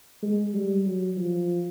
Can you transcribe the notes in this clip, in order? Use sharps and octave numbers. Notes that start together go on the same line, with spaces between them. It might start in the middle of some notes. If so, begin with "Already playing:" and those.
G#3
G3
F#3
F3